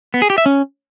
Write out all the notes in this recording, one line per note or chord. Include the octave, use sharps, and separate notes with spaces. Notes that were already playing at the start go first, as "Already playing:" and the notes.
B3
G#4
G4
E5
C#4